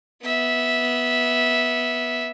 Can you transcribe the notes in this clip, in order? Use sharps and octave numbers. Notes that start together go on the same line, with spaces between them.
B3 E5